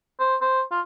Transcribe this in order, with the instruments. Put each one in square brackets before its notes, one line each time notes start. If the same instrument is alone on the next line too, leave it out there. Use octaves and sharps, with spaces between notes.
[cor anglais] C5
C5
F4